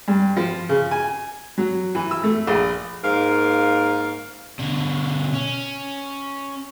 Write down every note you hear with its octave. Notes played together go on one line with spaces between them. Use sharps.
G2
F3
C#3
G#5
F#3
E3
E6
A3
A#1
G#2 A#3 A#4 F5
B2 D3
C#4